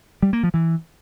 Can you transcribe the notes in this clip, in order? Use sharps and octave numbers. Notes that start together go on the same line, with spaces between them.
G3
A#3
F3
E3